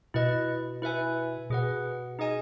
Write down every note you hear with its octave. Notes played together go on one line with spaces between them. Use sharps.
B2 E4 B4 D#5
E4 B4 E5 G#5
B2 G#4 B4 F#5
D#4 G#4 D#5 G#5